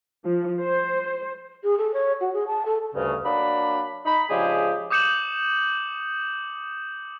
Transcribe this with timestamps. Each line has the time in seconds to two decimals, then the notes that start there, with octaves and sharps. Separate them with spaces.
0.25 F3
0.59 C5
1.63 G#4
1.78 A4
1.93 C#5
2.20 F#4
2.33 G#4
2.47 A5
2.65 A4
2.94 D2 G2 C#3
3.24 F#3 A#3 D4 D5 B5
4.05 D#4 B5
4.29 C#3 F3 G#3 D4 G4 G#4
4.90 D6 D#6 G6 C#7 E7 F#7